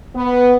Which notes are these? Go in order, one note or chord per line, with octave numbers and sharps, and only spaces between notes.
B3